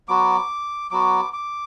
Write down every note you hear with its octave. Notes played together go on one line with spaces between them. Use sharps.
F#3 B3 F#4 D6
F#3 B3 F#4 D6
D6